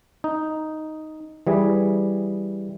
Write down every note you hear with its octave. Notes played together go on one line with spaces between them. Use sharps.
D#4
E3 G3 G#4